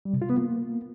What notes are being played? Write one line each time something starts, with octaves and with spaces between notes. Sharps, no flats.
G3
C3
F4
B3
A#3